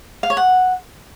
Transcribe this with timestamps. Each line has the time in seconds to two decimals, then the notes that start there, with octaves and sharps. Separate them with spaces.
0.23 F5
0.30 C#5
0.37 F#5